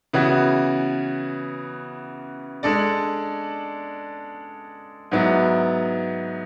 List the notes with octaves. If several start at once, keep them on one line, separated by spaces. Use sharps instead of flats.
C#3 E3 B3 F#4
G#3 D4 A4 D5
G#2 F#3 B3 E4